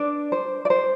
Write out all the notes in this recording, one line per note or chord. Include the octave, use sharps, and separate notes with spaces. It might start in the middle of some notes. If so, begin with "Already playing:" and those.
Already playing: D4 B4 D5
C5
D5
C5